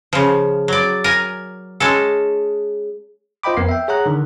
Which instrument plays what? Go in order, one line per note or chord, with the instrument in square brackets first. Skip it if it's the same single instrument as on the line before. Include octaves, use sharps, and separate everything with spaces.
[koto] C#3 F3
F#3 D5
A#4 G#5
G#3 C#4 A4
[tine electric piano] F4 C5 D#5 G5 B5 D6
F2 B3 A#4 C7
E5 G5
G#4 C#5 F#5 A#5 F#6
D3 D#3 D4